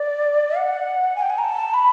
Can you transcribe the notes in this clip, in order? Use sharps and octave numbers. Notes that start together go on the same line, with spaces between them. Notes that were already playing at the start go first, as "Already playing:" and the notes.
Already playing: D5
F#5
G#5
G5
G#5
A#5
A5
B5